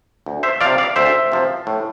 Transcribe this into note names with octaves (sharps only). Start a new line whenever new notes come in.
D2
C5 E5
C3 F3 D5 F5
D5 F5
D2 C5 E5
C3 F3
A2